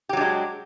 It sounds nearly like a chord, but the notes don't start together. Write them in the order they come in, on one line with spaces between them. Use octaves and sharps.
G4 F#3 D4 G#3